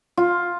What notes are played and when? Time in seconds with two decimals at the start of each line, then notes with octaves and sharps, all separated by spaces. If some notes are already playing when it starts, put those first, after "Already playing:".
0.17 F4